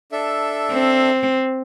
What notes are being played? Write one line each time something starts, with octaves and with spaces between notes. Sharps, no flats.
D4 A4 E5
C4